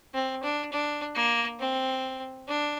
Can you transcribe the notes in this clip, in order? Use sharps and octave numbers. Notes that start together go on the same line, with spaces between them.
C4
D4
D4
A#3
C4
D4